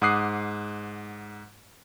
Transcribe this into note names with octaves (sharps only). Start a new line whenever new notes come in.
G#2 F#5 D6 D#6 F#6 C7